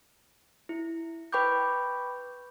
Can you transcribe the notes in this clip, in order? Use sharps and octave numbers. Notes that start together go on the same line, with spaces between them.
E4
B4 G5 B5 C#6 D6 G6